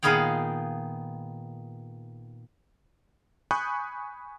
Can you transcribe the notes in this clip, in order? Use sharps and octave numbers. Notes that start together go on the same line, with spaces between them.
A#2 D#3 B3 G#4 F5 G5
G#5 B5 C#6 D#6 F#6 G6